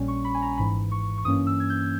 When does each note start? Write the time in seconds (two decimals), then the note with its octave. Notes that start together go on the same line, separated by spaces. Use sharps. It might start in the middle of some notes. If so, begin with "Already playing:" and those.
Already playing: A#1 A#2 G3 C#4
0.08 C#6
0.24 B5
0.34 G#5
0.42 A#5
0.58 G#1 G#2 E3 B5
0.91 C#6
1.18 C#6
1.24 G2 E3 A#3 C#4 D#6
1.47 E6
1.60 G#6
1.70 G6